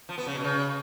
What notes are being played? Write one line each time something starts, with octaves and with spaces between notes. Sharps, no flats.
F3
B3
C#3
B2
C#3